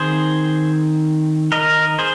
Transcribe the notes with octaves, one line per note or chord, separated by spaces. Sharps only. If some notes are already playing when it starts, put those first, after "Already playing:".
Already playing: D#3 C4 G#4 C5
A#4 D#5
G#4 C5